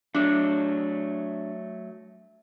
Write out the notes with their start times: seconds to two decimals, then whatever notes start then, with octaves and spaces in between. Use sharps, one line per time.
0.15 F#3 A3 D4